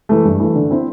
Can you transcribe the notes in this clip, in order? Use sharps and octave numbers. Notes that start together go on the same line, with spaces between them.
E3 A3
G2
E3 A3
D3
C4 E4